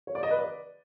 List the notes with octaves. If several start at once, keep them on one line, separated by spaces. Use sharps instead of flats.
C#5
D5
D#5
B4
D5